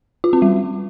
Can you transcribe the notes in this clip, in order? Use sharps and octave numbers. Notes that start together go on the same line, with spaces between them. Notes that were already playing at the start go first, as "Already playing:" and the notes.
F4
C4
G3